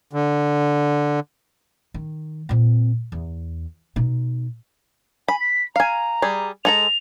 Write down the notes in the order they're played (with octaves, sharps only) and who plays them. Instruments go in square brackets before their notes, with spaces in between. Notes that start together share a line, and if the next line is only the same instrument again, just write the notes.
[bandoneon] D3
[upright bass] D#3
A#2 C4
E2
B2 D#4
[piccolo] G#5 [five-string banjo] B5
[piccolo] B6
[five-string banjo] F5 G#5 [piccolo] A#5
[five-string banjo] G3 G#4
[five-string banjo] G#3 A4 A#5 [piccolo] F7